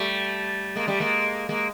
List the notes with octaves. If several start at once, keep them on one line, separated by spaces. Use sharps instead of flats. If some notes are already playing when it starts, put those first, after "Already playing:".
Already playing: G3 A3
G#3 A#3
G3 A3
G#3 A#3
G#3 A#3